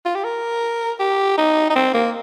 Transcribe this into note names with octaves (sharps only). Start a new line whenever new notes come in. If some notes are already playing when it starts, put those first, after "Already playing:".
F4
G4
A#4
G4
D#4
D#4
C4
A#3